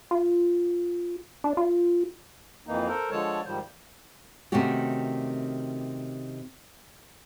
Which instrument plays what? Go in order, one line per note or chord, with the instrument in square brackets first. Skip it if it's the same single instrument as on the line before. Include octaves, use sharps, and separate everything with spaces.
[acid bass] F4
D4
F4
[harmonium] F2 E3 A#3 D#4
A4 A#4 C5
D3 F3 G#3 A4 C#5 A5
G#2 D#3 F3 G3 C5
[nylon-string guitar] C3 D#3 A3 C#4 F#4 G4